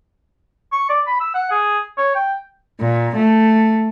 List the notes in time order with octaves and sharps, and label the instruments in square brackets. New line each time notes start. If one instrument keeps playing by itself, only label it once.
[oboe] C#6
D5
B5
E6
F#5
G#4
C#5
G5
[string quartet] A#2
A3